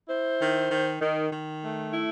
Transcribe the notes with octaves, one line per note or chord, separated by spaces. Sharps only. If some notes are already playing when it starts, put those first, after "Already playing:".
E4 C5
D#3
D#3
D#3
D#3
A3
E4